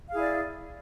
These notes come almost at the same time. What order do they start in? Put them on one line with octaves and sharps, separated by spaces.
F5 G#4 E4 D5